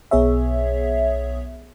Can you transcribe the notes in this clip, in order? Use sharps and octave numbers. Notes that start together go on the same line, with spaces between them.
B1 B3 G#4 C#5 E5